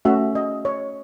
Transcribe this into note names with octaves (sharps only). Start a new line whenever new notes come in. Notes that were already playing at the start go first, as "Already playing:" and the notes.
A3 C#4 F#4 E5
D#5
C#5